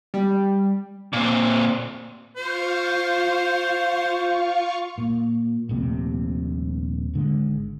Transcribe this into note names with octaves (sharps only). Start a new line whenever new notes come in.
G3
A#2 C4
F4 C5 F5 C#6
A#2
D#1 A#1 C3 A3
G#1 D3 G#3